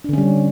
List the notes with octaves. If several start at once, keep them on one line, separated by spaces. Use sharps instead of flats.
D3 G3 C#4 D4